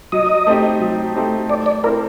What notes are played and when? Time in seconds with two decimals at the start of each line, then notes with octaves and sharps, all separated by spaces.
0.12 F#3 D#5
0.47 A3 C4 D#4 G4
0.81 F#3
1.15 A3 C4 D#4 G4
1.49 A3 D5
1.66 D5
1.84 C4 E4 A4 A#4